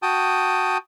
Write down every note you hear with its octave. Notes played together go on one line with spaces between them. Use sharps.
F#4 G5 A5 D#6